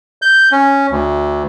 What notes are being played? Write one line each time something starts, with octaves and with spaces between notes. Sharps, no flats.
G6
C#4
D2